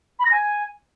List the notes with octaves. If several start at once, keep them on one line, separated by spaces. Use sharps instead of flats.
B5
A#6
G#5